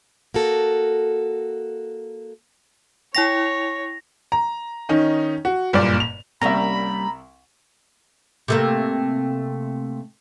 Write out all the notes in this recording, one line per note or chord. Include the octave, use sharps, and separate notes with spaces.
A#3 F#4 A4
E4 C#5 G5 A#6 F7
A#5
D#3 C#4 D#4
F#4
F#1 G2 A#2 D5
F7
C2 G3 A#3 C#4 E5 A#5 B5
C3 A3 A#3